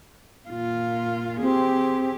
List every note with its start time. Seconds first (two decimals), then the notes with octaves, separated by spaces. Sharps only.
0.50 A#2 F4
1.41 C4 G4 G#4